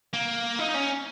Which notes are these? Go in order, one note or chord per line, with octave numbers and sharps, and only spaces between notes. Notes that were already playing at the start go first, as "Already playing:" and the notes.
A#3
D#4
C#4